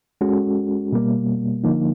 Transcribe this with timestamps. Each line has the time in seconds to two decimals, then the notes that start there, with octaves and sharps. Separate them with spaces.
0.21 G#3 C#4 F#4 A4
0.92 B2 G3 A#3
1.64 D3 F3 A#3 D#4